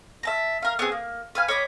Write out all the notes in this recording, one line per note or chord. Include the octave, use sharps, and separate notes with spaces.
E5 A5 A#5
A#4 F5
B3 C4 G#4
A#3
B4 F5 G#5
C#5 D#5 B5 D6